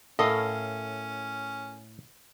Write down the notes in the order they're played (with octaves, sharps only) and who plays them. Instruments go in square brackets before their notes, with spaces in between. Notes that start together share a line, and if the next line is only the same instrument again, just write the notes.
[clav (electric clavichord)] A2 [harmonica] C#4 [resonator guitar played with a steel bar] A4 A#4 F5 [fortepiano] D#5